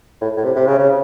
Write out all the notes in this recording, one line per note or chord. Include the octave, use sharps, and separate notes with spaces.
A2
A2
C3
C3
C#3
C#3